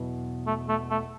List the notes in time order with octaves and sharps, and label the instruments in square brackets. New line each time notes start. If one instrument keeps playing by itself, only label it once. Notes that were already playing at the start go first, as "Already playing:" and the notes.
Already playing: [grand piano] E2 B2 F#3 B3
[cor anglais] A3
A3
A3